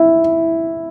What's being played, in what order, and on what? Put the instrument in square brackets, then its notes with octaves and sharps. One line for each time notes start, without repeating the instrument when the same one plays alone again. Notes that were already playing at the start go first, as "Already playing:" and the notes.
Already playing: [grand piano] E4